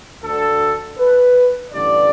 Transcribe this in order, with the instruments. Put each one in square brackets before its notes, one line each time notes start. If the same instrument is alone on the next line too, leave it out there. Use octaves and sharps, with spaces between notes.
[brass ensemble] D2 D3 A4
B4
A1 G2 D3 D5